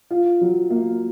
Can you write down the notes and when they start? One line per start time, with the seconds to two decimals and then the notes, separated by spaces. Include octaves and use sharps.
0.11 F4
0.41 F#3
0.70 A#3